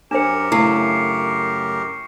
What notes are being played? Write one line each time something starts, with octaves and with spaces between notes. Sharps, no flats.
F#2 D4 G4 A#4 C5 C#7 E7
C#3 A3 E4 C#6 C7